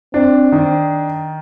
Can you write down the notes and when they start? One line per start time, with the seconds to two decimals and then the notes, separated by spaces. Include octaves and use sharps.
0.14 C4 D4
0.52 D#3